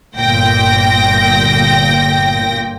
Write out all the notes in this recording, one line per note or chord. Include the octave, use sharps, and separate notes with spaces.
G1 A#2 G5 A#6